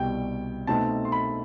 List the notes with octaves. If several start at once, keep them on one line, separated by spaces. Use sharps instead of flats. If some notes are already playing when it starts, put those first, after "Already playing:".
Already playing: C2 B2 G3 G5
B2 A3 C4 D#4 A5
C6
B5